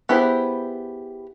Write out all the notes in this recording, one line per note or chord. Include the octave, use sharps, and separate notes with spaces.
B3 E4 G4 G#4 C5